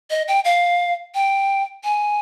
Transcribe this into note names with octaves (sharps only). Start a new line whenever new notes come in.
D#5
G5
F5
G5
G#5